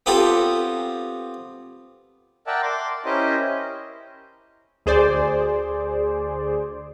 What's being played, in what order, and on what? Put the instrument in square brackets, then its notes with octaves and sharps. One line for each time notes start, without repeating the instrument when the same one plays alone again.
[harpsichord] B3 C4 F4 G4 A4
[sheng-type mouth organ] A#4 D5 E5 F#5 G5 A5
C6 D6
C#4 E4 G4 A#4 C5 D#5
[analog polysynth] D2 G#4 C5 D5